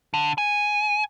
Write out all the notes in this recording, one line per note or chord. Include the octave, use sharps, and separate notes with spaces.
D3
G#5